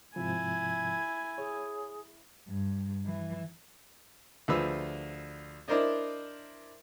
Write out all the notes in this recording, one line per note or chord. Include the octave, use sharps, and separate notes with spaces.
G#2 C3 F3 E4 G#5
G#4 C#5
G2
E3
D2 F3 G#4 B4 E6
D4 E4 A#4 C5 D5 D#5